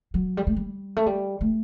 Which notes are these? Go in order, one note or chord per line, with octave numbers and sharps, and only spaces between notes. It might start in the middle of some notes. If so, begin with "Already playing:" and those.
F#3
G3
A3
G3
A3
G3
A3